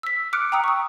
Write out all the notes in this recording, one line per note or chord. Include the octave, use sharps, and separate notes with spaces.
E6 B6
D6 F6 F#6 C#7 D7
G5 A#5 D#6 E6
C#6 D#6